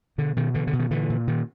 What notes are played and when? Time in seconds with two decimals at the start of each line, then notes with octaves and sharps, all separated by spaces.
0.18 B2 D3
0.36 B2 D#3
0.54 B2 D3 E3
0.67 D3
0.73 B2
0.79 D#3
0.91 A#2 D3 E3
1.10 A#2
1.27 A#2 D#3